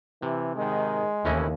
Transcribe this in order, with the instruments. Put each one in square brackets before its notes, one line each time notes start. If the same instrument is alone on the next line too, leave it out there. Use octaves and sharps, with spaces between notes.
[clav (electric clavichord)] C3 [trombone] E3
[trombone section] G#2 D#3 [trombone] G#3
[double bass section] D#2 [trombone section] C3 A3 E4 [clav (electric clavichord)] E3 C#4 D#5